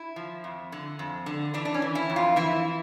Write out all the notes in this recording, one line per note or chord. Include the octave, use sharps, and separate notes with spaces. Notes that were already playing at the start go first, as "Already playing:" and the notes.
Already playing: E4
F3
F2
D3
F2
D3
E3 D4
D4
C#4
E3
E4
F2
F4
E3 E4